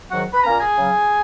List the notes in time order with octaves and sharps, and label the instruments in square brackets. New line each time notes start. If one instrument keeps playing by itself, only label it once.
[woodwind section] G#2 D#3 F#3 F#4 F#5
B4 B5
A#2 A#3 C#4 A#4 A#5
G#4 G#5
C#3 F#3 C#4